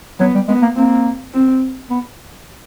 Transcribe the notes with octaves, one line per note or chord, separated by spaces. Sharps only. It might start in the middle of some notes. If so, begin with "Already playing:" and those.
F#3 B3
G3
G#3 B3
A#3
A#3 C4
C4
B3